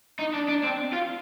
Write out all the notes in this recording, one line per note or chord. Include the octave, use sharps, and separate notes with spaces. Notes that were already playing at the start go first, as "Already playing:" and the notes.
D#4
D4
D4
C4
F4